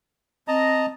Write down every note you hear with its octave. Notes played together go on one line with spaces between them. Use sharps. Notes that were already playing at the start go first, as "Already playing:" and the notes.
C4 D#5 A5 A#5